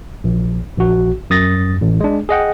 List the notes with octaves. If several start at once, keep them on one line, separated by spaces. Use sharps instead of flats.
A#1
A#1 F#4
F#2 D#6 A6 A#6
A1
G#3 D4
G#4 D#5 F#5 G5